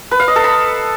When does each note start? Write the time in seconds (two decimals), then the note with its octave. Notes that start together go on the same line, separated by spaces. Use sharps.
0.11 B4
0.20 F5
0.28 D#5
0.36 A4
0.44 B5